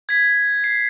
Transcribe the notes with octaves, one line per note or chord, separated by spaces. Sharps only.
G#6 B6
C7